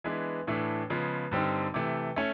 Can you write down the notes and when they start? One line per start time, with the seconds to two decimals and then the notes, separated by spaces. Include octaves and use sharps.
0.04 E3 G#3 B3 D4
0.47 A2 E3 A3 D4
0.90 C#3 F3 G#3 B3
1.31 G2 D3 G3 C4 D#4
1.74 C3 E3 A3
2.16 A3 C#4